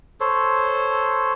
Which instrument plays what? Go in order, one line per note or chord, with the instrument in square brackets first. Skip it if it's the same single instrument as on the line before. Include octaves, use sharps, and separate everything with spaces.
[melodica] A4 C5 C#5